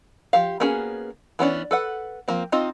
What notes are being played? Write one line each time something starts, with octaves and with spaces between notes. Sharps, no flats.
F3 G4 F5
A#3 B3 C#4 F#4 G#4
E3 B3 C#4 D4
A4 B4 F#5
F3 A#3 C4
C4 D#4 F4 D#5